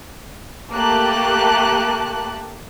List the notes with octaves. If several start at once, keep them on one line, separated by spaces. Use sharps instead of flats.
A3 A#3 G4 A4 A5 F#6